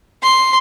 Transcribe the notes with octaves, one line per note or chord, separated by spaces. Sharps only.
C6